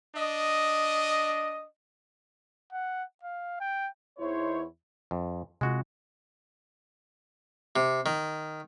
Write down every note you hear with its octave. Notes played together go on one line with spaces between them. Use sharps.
D4 D#5
F#5
F5
G5
E2 D#4 E4 C5 C#5
F2
C3 G#3 F4 F#4
C3
D#3